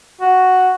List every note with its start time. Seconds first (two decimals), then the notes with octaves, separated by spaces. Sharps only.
0.21 F#4